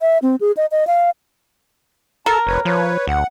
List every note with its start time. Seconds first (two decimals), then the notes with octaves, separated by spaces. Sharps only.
0.01 E5
0.22 C4
0.41 G#4
0.57 D#5
0.71 D#5
0.87 F5
2.26 A4 A#4 A5
2.47 F1 D#2 B4 C#5
2.65 F3 B4 C#5
3.07 D2 F#5